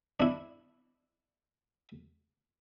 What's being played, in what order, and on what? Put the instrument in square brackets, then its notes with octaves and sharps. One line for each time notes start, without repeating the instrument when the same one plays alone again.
[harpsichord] D4 E4